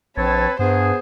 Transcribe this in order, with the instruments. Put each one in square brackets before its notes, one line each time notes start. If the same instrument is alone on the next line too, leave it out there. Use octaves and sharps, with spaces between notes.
[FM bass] A#1 [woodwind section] C4 C#5 A5 [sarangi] B4
[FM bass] G2 [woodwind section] B3 G#4 [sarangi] C5